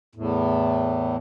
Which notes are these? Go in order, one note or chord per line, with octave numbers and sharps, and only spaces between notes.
E2 A2